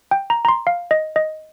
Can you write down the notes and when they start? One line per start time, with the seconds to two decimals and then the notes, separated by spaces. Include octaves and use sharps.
0.11 G5
0.30 A#5
0.45 A#5
0.49 C6
0.67 F5
0.91 D#5
1.16 D#5